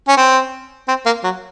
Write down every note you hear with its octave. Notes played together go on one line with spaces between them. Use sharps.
C#4
C4
C4
A#3
F#3